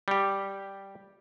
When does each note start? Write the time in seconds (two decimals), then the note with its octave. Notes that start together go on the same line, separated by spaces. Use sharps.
0.08 G3 G4